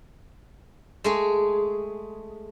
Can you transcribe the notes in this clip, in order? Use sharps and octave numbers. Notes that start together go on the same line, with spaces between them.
G#3 A3 G#4